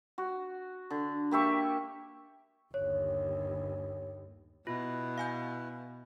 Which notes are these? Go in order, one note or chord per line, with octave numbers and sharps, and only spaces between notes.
F#4
D3
A#3 G4 E5 C#6
G1 D#2 C#5
B2 E4 F4 B4
F5 G#5 G6